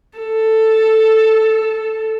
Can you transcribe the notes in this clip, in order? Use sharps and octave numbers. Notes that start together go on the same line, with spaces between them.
A4